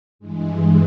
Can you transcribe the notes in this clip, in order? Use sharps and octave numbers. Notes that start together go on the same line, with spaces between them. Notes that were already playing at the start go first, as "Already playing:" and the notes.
G2 E3 G#3